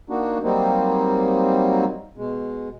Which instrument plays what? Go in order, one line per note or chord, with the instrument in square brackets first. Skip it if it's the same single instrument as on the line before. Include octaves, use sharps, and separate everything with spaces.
[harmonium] A#3 D4 D#4 F#4
F#3 G3 A#3 C4 D#4
B2 G#3